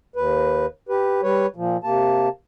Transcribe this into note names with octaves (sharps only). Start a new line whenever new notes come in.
D#2 B4
G4 B4
G3 B4 C#5
A#2 F3
C3 A#3 A5